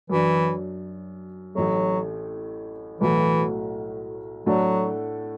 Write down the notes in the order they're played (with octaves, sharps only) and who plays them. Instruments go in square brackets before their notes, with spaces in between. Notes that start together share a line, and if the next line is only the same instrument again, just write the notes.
[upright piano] F#2 F#3 D4 [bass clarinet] E3
[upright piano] A1 A2 A3 [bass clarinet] F#3
[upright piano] B1 A2 F#3 A3 F#4 [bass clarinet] E3
[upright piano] A2 A3 D4 F#4 A4 [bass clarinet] F#3